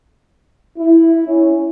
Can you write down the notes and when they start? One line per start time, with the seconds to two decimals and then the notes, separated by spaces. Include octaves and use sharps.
0.77 E4
1.28 C#4